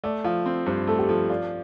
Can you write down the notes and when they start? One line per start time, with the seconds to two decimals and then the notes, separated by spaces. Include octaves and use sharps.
0.04 A3 D5
0.24 F3 F5
0.46 C4
0.66 G2 C5
0.87 A3 A4
0.99 G4
1.09 F3 A4
1.30 F4 D5